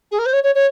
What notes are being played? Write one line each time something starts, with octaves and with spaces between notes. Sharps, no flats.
G#4
A#4
C5
C#5
C#5
C#5